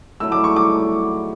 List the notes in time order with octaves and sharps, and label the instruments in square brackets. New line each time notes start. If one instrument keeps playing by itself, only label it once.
[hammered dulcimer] F#3 A3 E4 [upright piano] E6
[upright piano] D6
C#6
D6